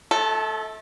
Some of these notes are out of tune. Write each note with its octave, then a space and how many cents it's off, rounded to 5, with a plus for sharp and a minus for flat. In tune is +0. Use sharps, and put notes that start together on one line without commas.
A3 -35 A4 +0